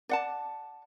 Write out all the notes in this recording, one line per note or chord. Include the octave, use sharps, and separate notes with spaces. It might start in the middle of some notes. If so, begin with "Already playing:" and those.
D5 F#5 A5